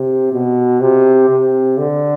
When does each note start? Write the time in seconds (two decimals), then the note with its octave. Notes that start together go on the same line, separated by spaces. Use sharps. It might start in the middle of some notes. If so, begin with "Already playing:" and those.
Already playing: C3
0.32 B2
0.80 C3
1.29 C3
1.78 D3